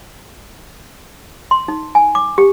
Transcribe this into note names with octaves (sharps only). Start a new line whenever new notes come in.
C6
D#4
G#5
D6
G4